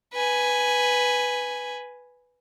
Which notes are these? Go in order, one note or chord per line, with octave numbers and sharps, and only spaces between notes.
B4 G#5